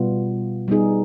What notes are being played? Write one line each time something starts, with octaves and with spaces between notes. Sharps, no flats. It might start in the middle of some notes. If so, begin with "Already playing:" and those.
Already playing: B2 G3 B3 F4
G3 B3 D#4 G#4